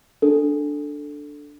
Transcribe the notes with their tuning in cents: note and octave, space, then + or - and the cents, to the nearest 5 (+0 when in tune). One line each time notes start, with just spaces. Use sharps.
D4 +0 A4 +0